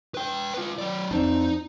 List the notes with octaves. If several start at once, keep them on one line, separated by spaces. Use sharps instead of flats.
B4 G5
F4 B4
F#3 D5
F2 C4 D4 D#4